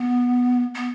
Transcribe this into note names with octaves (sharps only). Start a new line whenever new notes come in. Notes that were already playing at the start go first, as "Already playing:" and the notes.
Already playing: B3
B3